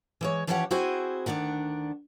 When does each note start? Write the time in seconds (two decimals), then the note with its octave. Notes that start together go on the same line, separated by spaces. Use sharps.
0.21 E3 G#3 C#5
0.47 E3 F3 C#4 G4 C#5 F#5
0.71 C4 E4 F#4 G#4 C5 G#5
1.26 D2 B2 D#3 D4 F#5